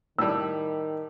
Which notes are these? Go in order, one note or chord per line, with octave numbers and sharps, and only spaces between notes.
A2 D#3 G3 E6